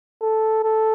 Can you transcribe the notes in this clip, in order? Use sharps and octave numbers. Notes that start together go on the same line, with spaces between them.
A4
A4